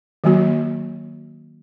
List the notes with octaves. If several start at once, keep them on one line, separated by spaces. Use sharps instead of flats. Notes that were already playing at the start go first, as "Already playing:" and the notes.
D#3 F#3 A#3 F#4